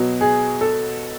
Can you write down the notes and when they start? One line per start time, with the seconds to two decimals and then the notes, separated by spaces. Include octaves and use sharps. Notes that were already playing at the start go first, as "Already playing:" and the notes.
Already playing: B2 F#3
0.21 G#4
0.61 A4